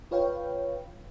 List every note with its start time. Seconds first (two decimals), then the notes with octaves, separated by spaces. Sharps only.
0.11 F4 B4 C#5 F5 G5